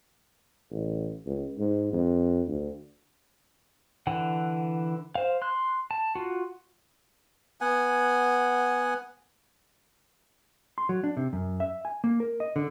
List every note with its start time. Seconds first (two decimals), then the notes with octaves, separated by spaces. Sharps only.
0.71 A1
1.26 C#2
1.59 G#2
1.93 F2
2.48 D2
4.07 D3 E3 F#5
5.15 C5 F5
5.42 C6 F#6
5.91 A5
6.15 F4 F#4
7.61 B3 F#5 G#5
10.78 C6
10.89 F#3
11.04 D4
11.17 C3
11.33 F#2
11.60 E5
11.85 G#5
12.04 A#3
12.20 A#4
12.40 D#5
12.56 D3